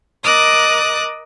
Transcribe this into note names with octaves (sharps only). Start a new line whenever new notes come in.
A#4 D#5 D6 D#6 F#6 A6